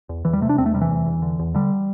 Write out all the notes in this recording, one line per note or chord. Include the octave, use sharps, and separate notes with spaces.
E2
E2 E3
G3
C3 A3
D4
E2 C4
A3
C3 G3
E3
E2
E2
D3
E2
D3 G3